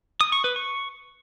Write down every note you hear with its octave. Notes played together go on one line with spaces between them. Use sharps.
D#6
C#6
B4
C#6